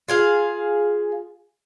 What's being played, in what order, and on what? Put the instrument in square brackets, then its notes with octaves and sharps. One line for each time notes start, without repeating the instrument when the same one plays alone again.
[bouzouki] F4 G#4 F5